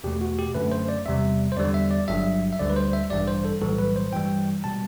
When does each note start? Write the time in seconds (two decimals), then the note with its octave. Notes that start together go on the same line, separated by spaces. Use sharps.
0.04 E2 B2 A3 G4
0.21 F#4
0.39 G4
0.55 F#2 D3 A3 B4
0.72 C5
0.89 D5
1.06 E2 C3 G3 E5
1.52 C5
1.57 E2 D3 G3 D5
1.74 E5
1.91 D5
2.08 G1 G2 F#3 E5
2.53 E5
2.59 D2 D3 G3 D5
2.70 B4
2.76 C5
2.93 E5
3.10 A1 G2 E3 G3 D5
3.28 C5
3.45 A4
3.61 B1 A2 E3 G3 A4
3.78 B4
3.96 C5
4.12 G2 E3 G3 G5
4.64 B2 G3 A5